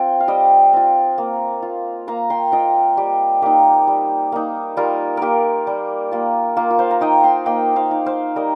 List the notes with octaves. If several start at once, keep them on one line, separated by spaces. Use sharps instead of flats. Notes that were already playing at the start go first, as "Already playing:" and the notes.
Already playing: C4 F4 G5
F5
G3 D#5 G5
C4 F4
A#3
F4
A#3 F5 A#5
G5 C6
F4 D#5 G5
G3 G4
A#3 D#4 G4
G3
A#3 D#4
G3 F4 A#4
A#3 F4 G4 A#4
G3
A#3 F4
A#3 F4
F4
C5 F5
A#5
D#4 D#5 G5
G5 C6
A#3 D#5 G5
C5 F5
D#4
C5 F5
G3 A#4 D#5